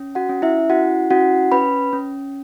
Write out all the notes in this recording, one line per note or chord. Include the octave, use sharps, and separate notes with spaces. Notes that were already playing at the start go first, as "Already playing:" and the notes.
Already playing: C#4
F#4 F#5
C#4
E4 E5
E4 F#4 F#5
C#4 F#4 F#5
C#4 B4 B5
C#4